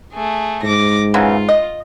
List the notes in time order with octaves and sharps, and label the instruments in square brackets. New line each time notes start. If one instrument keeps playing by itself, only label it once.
[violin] A3 G#4
[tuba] G#2 [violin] D6 A#6
[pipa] C#3 E3 F#3 [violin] F4
[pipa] D#5